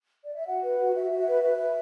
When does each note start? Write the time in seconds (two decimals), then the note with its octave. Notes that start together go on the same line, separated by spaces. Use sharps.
0.24 D5
0.35 E5
0.47 F#4 F#5
0.63 B4
0.79 F#4
0.95 F#4 E5
1.11 F#4
1.19 E5
1.27 B4
1.43 B4 E5
1.59 B4